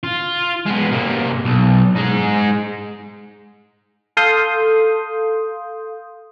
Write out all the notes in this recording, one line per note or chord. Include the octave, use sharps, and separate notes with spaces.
F4
G#3 B3
C3 A#3
B1
G#3 D#4
A4 F5 C6 D#6 G6